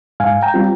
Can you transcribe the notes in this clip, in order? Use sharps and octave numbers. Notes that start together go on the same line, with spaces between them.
G#2 F5 G#5
G5 A#5
G3 C4 F4